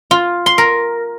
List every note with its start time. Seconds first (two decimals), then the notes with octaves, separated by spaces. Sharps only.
0.11 F4
0.46 C6
0.58 A#4